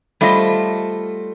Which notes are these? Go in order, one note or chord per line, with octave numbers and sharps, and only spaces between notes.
G3 A3 F4 C5 D#5